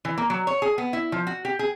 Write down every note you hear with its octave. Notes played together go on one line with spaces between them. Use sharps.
E3
A#3
F#3
C#5
G#4
B3
E4
F3
F#4
G4
G#4